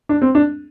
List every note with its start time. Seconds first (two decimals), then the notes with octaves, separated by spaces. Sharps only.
0.09 D4
0.22 C4
0.35 D4